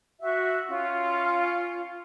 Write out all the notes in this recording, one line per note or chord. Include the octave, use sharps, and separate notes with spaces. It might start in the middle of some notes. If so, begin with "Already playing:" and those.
F#4 E5
C#4 F4